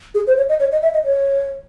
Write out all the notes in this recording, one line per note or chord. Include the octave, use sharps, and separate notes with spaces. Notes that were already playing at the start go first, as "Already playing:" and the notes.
G#4
C5
C#5
D#5
C#5
D#5
E5
D#5
C#5